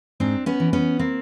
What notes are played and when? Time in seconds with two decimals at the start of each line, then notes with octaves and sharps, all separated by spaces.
0.20 G#2 C4 D4
0.46 B3 C#4
0.60 E3
0.73 B3 C#4
0.99 A#3 C4